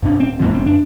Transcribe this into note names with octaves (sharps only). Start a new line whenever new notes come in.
G2 B2 D4
D1 C4
E2 A2 D3 F3 G3 B3
F1 C4
F#2 D4